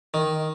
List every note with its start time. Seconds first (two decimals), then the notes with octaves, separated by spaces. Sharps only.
0.14 D#3